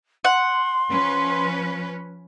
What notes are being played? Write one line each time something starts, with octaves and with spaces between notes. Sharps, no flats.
F#5 C6
F3 C#4 B4